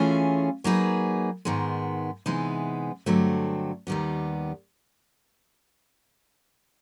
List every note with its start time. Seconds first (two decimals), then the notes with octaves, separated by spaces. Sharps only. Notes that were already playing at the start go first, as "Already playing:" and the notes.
Already playing: E3 A3 C#4 F4 G#4
0.64 F#3 A#3 D#4 G#4 B4
1.45 G#2 D#3 G#3 B3
2.26 C3 E3 G#3 B3 D#4
3.06 G2 D3 F#3 A3 C4
3.87 D#2 D#3 G3 B3